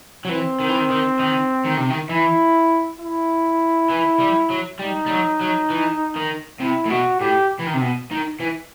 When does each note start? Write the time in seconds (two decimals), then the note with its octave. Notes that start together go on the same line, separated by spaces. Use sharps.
0.25 F#3
0.29 E3 C4
0.60 D#3
0.68 E3
0.76 D#3
0.90 D#3
1.19 D#3
1.65 D#3
1.77 C3
1.90 D#3
2.09 E3 E4
3.00 E4
3.90 E3
4.20 G3
4.50 F#3
4.80 G3 D#4
5.06 G3
5.10 F#3
5.41 F#3
5.70 E3
6.16 D#3
6.60 C3 E4
6.86 A2
6.90 B2 F#4
7.20 A2 G4
7.59 E3
7.66 D#3
7.74 C3
7.81 B2
8.11 D#3
8.40 E3